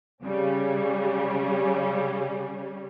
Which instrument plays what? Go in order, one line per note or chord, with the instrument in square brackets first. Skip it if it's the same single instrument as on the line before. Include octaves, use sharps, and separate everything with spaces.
[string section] C#3 G3 C#4